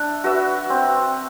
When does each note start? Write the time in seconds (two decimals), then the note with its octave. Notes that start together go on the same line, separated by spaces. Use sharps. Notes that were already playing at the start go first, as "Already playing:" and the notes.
Already playing: D4 E5
0.24 F#4 B4 E5
0.70 C4